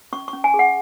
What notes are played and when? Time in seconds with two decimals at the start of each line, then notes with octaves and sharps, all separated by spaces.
0.13 C#4 C#6
0.28 C#6
0.33 C#4
0.44 G#5
0.54 G#4
0.59 F#5